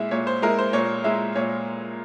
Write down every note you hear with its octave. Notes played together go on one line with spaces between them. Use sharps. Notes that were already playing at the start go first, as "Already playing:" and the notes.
Already playing: A#2 G#3 E4 E5
A#2 C#5
C5
G#3 E4 A#4
C5
A#2 C#5
G#3 E4 E5
A#2 C#5